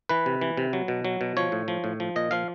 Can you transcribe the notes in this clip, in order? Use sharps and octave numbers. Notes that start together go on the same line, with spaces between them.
E3 B4
C3
E3
C3
F#3
B2
F#3
B2
F3 C#5
A2
F3
A2
F3
A#2 D#5
F3 F5